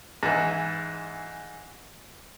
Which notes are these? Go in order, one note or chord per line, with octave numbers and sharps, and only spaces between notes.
G#2 E3